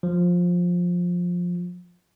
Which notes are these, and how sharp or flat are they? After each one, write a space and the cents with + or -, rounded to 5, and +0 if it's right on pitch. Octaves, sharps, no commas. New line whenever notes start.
F3 +15